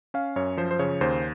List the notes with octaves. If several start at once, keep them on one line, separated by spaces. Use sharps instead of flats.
C#4 F5
F#2 C#5
F3 C5
C5
C#3 C#5
D#2 C5